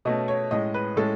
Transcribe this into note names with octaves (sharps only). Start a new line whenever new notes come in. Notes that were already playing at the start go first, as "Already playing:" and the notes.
B2 A3 C#4 D#5
C#5
A2 G#3 C#4 D#5
B4
A2 G#3 C#4 A4